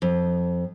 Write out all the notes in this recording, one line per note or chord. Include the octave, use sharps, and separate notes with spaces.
F2